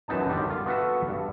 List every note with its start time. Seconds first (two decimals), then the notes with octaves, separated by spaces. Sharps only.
0.08 F#2 E3 B3 D#4 A5
0.29 D3 D#3 G3
0.50 F4
0.66 B3 F#4 A4 B4 E5
1.08 G2